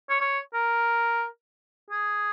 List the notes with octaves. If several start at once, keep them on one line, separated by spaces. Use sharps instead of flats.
C#5
C#5
A#4
G#4